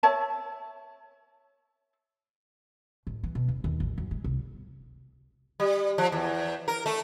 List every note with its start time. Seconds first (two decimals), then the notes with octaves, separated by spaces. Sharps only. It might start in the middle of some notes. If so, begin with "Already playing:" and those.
0.03 C#5 E5 A5
3.07 A1
3.23 E3
3.35 B2
3.48 E1
3.64 D#2
3.80 A1
3.98 F#2
4.11 G#3
4.24 C2
5.60 G3
5.98 F3
6.12 E2
6.68 A#4
6.86 A3